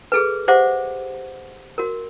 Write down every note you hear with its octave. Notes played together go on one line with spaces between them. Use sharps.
G#4 A4 B4
G4 C5 E5 F#5 D6
F#4 A#4